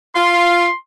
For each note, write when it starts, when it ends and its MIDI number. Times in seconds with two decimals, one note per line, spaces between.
0.15 0.66 65
0.15 0.74 84